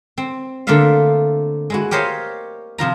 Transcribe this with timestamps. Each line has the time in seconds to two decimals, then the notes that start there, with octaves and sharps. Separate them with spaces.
0.18 C4
0.67 D3 A3 A#3 F4 E5 F5
1.70 G#3 E4 F#4
1.91 G4 A#4 C5 C#5 D#5 F5
2.78 C3 F3 F4 A#5